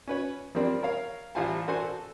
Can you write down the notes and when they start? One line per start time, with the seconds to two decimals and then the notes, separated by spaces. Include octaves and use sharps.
0.08 C#4 B4 C#5
0.55 F3 G3 A#3 C4 D4 A#4
0.83 A#4 C#5 F5
1.35 A1 G3 F4 C5 G#5 A5
1.68 D4 F#4 A4 A#4 C5 G#5
1.83 A4